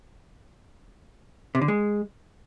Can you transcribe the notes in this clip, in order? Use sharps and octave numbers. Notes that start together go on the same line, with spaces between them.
C3
D3
G#3